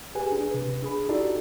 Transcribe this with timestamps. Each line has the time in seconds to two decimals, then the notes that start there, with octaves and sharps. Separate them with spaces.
0.15 G4 G#4 B4 G#5
0.32 D4 G#4
0.51 C3 B4
0.82 D4 G#4 B5
1.08 D#4 E4 F#4 G4 A4 D5